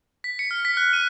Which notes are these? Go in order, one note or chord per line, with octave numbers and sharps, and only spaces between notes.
B6
C#7
F6
B6
F#6
D#7